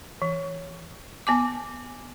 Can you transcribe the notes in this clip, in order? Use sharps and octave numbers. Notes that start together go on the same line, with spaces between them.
E3
B3 G#5 D6